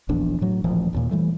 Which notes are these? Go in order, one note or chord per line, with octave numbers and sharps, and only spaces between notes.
D#1 A#1 E2 D4
A2 F#3
D#1 A1 F3
A1 D#2 A#2
E3 G3 A3